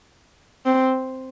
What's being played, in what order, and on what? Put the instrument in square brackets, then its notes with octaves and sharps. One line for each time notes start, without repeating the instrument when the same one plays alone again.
[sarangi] C4